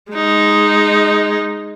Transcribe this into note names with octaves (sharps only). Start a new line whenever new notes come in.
G#3 D#4